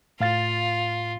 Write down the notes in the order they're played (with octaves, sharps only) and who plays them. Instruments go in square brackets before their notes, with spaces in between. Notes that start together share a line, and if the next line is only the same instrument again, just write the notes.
[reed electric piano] A2 F5 A6 [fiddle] F4